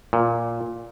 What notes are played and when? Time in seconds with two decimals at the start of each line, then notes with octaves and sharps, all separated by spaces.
0.13 A#2